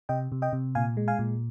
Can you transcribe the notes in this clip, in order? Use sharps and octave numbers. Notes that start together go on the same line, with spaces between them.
C3 D#5 G5
C3
D#5 G5
C3
A#2 F5 G#5
G#3
F5 G#5
A#2